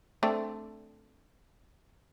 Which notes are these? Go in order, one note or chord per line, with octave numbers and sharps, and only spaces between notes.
A3 C4 D4